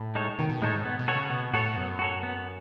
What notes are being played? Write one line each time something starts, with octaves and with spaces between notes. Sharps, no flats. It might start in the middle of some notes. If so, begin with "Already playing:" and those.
Already playing: A2
G#3 D#4 A4 C#5
B2 D#3
B2
A2 G#3 D#4 A4 C#5
G#2
B3
B2
F#4 A4 C#5
C#3
B2 B3
A2 F#4 A4 C#5
F#2 B3
F#4 A4 C#5
B3